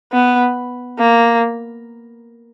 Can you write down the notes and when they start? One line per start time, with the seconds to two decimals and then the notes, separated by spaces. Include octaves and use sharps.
0.13 B3
0.99 A#3